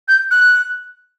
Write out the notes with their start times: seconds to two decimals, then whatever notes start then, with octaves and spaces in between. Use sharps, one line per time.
0.08 G6
0.31 F#6